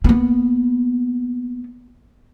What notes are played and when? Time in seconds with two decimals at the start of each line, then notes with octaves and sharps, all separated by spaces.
0.04 A#3 B3